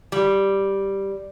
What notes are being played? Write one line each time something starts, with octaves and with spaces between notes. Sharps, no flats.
G3